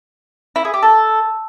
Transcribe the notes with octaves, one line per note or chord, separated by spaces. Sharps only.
E4
G#4
G4
A4